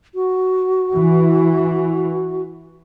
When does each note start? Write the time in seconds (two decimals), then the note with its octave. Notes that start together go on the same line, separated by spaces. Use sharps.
0.15 F#4
0.93 E3